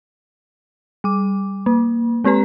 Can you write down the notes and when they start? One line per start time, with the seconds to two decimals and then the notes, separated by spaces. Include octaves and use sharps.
1.04 G3 D6
1.66 A#3
2.24 G#3 C4 G4 B4 A#5